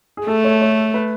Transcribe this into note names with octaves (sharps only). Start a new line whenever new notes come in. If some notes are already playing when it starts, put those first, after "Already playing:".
G#4
A3 A4
C#5
C#5
B4